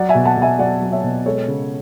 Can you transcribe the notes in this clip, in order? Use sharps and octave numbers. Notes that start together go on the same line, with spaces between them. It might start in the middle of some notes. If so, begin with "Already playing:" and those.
Already playing: F#3 D5 F#5
E5 G#5
B2
F#5 A5
B2
E5 G#5
F#3 D5 F#5
F#3
C#5 E5
B2
G#3 A4 C#5
C#3